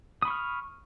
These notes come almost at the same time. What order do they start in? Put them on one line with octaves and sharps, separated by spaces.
D#6 B5 C#6 F6